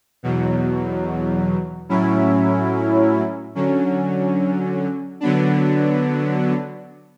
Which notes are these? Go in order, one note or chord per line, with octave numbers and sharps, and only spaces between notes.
E2 B2 F#3
A2 F#3 C#4 E4
D3 F#3 C#4
D3 F#3 B3 D4